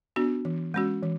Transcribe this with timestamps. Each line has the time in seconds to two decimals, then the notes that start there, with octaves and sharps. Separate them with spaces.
0.16 B3 D4 F#4
0.45 E3
0.74 G#3 C#4 F#4
1.03 E3